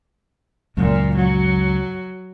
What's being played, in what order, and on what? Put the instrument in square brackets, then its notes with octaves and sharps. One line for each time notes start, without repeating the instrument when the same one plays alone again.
[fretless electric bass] C#2 F#2 [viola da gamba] A#2
[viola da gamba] F#3